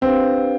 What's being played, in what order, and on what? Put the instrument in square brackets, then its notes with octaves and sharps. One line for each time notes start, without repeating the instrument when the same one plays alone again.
[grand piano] C4 [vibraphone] D4 G4 B4 F5